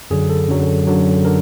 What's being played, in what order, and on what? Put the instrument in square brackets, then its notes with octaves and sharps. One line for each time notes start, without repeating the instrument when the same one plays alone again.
[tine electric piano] F#2 D3 F#3 G#4
A4
F#2 D3 F#3
F#2 D3 F#3
D3 A#4